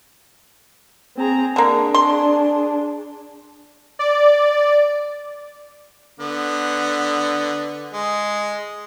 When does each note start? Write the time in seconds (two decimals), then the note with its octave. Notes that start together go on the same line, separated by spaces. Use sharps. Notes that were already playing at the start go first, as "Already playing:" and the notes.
1.18 C4 G#4 A#5
1.56 D3 A#3 D4 G#4
1.94 C6
3.99 D5
6.20 D3 B3
7.93 G#3